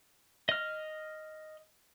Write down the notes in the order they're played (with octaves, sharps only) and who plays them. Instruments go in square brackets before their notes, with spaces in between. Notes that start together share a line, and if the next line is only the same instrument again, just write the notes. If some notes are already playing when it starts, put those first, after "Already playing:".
[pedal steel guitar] D#5 F6